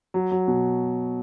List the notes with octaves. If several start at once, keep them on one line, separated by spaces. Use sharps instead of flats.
F#3
F#3
B2